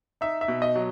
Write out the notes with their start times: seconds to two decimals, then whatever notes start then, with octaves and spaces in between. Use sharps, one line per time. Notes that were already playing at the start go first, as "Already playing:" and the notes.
0.21 D#4 E5
0.41 E5
0.48 B2
0.62 D#5
0.75 F#3